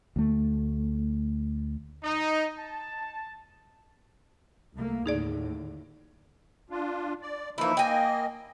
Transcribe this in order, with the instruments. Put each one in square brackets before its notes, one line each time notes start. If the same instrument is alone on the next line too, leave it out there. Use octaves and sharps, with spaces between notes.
[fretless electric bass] D2 A3
[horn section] D#4
A5
[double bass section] C2 A3 A#3
[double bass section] D#2 A2 D3 [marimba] D#4 G#4 D5
[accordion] D4 F4
D5
[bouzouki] E3 E4 [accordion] F3 A#3 D#4
[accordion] A#3 D#5 [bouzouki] G5 G#5